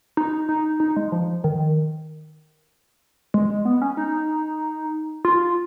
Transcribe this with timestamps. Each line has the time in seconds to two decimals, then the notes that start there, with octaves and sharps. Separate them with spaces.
0.17 D#4
0.49 D#4
0.80 D#4
0.96 G#3
1.12 F3
1.44 D#3
3.34 G#3
3.50 G#3
3.65 B3
3.82 C#4
3.97 D#4
5.25 F4